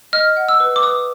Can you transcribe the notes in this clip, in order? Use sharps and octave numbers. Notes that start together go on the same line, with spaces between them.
D#5 F6
F#5
E6
B4
D6
B4 D#6